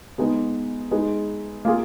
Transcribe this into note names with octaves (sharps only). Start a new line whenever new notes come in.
G#3 B3 D#4 G#4 B4
G#3 D#4 G#4 B4
A#3 F4 G#4